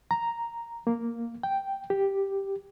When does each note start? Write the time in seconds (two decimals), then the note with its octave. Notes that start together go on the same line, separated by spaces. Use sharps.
0.11 A#5
0.87 A#3
1.43 G5
1.90 G4